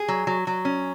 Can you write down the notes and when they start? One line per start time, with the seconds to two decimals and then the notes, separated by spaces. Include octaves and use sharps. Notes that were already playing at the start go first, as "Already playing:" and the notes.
Already playing: G#4
0.08 F#3
0.27 F#3
0.47 F#3
0.65 C#4